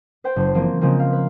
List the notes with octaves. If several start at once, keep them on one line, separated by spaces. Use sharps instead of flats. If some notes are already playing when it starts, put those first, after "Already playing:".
B4 C5 G5 G6
F#1
E3 F3 A#3 C4
C#3 F3 G#3 A#3 C4
F5
B4